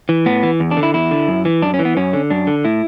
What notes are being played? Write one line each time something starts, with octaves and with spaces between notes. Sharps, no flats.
E3
A2 B3
E3
E2
D4
D3
E4
E2 E4
D3
F#2
E3
F#2 D4
C#4
E3
B3
F#2 C#4
D3
F#2 D4
D3
A2 E4